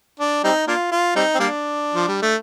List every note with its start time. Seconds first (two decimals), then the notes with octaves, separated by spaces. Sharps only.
0.20 D4
0.44 G3 C4 D#4
0.68 A#3 D4 F4
0.92 F4
1.16 G3 C4 D#4
1.35 C4
1.40 G3 A#3 D4
1.94 F3
2.08 G3
2.22 A3